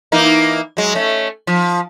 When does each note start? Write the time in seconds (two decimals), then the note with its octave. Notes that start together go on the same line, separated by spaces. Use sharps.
0.12 E3 A#3 D#4
0.77 F#3 G#3
0.95 A3 C#4
1.47 F3